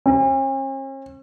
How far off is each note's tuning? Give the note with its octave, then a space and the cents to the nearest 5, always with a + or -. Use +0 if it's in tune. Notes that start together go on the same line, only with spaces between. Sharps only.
C#4 -45